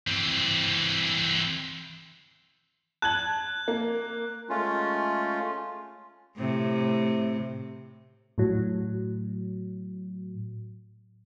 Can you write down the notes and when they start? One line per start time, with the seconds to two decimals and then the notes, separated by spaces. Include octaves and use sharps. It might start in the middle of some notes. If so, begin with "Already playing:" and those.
0.07 E3 C4
3.02 A5 F#6 G#6 F#7
3.68 A#3
4.49 G#3 A3 C#4 F4
6.37 A2 C3
8.38 A2 F#3